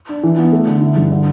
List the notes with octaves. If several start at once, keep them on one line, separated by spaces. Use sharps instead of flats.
D4
E3
B3
A3
D3
E4
G2
D3